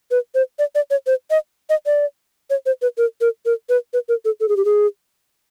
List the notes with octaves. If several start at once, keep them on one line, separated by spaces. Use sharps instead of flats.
B4
C5
D5
D5
C#5
C5
D#5
D#5
D5
C#5
C5
B4
A#4
A#4
A#4
B4
B4
A#4
A4
A4
G#4
G4
G#4